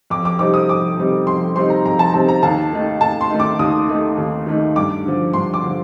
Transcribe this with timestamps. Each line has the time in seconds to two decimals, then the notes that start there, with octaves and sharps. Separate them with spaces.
0.10 F2 D6
0.25 D6
0.39 C3 G3 C4 D#4 D6
0.54 D#6
0.69 F2 D6
0.97 C3 G3 C4 D#4
1.26 F2 C6
1.56 C3 G3 C4 D#4 C6
1.70 A#5
1.85 F2 A#5
1.99 A5
2.14 C3 G3 C4 D#4 A5
2.28 A#5
2.43 D#2 A5
2.73 D#3 A3 D#4
3.01 D#2 A5
3.21 C6
3.30 D#3 A3 D#4
3.40 D6
3.59 D#2 D#6
3.89 D#3 A3 D#4
4.18 D#2
4.47 D#3 A3 D#4
4.76 G2 D6
5.06 D3 F3
5.34 G2 C6
5.54 D6
5.63 D3 F3